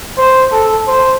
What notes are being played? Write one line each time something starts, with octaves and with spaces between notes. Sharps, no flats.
C5
A4
C5